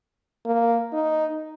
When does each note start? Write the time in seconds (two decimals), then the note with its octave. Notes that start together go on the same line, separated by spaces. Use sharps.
0.45 A#3
0.93 D#4